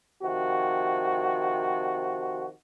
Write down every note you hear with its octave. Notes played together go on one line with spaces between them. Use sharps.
C3 D#3 F3 F#4